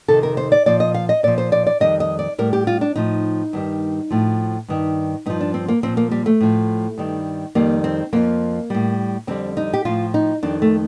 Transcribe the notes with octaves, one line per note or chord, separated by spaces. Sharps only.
F2 C3 D#3 A4
A#4
C5
D5
A#2 F3 D5
D#5
F5
D#5
A#2 F3 D5
C5
D5
D5
F2 D#3 G3 D#5
D#5
D5
A2 G3 A#4
G4
F4
D4
A2 F3 D#4
G2 D#3 G3
A2 F3
G2 D#3 G3
G2 F3 D#4
D4
C4
A#3
A#2 F3 C4
A#3
G3
A3
A2 F3
G2 D#3 G3
F2 D#3 G3 A#3
C4
F2 D3 F3 A#3
A2 G3
F2 D3 G3 C4
D#4
G4
A2 F3 F4
D#4
F2 D#3 G3 D4
A3